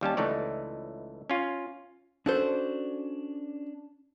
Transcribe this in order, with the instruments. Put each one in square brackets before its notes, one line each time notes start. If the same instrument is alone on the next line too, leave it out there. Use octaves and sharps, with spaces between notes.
[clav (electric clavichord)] D#2 G3 C#4 A5
C#2 E3 A3 D#4 C#5 D5
C#4 F4
[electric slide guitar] C#4 D4 D5 [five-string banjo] F#4 A4 C5